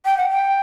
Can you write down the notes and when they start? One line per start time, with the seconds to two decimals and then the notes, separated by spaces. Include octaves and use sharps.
0.05 G5
0.17 F#5
0.29 G5